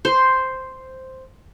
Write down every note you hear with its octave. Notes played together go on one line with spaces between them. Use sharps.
C5